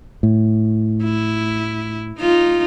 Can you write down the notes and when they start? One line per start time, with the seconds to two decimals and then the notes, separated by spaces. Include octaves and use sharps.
0.23 A2
1.03 E4
2.19 D#4 F4